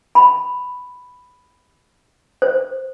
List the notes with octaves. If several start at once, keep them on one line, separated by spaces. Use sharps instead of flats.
B5
C5